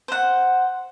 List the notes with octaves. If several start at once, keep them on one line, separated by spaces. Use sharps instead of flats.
C5 F#5